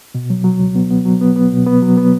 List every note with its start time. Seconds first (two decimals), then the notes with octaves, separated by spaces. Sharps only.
0.15 B2
0.30 F#3
0.44 F#3
0.60 C#2
0.75 B3
0.90 B3
1.05 F#3
1.21 B3
1.36 B3
1.52 B2
1.66 B3
1.82 F#3
1.97 B3